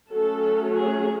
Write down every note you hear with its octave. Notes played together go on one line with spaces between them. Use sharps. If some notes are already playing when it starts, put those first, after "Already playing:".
F#3 A3 C#4 A4
G#4